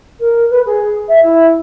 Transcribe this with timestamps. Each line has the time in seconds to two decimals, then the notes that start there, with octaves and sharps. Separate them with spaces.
0.19 A#4
0.50 B4
0.66 G#4
1.08 E5
1.22 E4